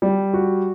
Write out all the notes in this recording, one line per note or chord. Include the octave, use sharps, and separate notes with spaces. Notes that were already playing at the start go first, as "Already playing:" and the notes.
G3
F#4